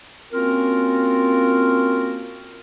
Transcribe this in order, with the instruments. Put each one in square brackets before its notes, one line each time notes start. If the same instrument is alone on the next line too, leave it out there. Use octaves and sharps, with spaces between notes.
[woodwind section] A#3 C4 C#4 F4 F#4 A#4